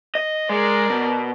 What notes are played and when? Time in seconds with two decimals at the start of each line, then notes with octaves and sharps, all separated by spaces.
0.15 D#5
0.49 G#3 A#4 D5
0.90 B2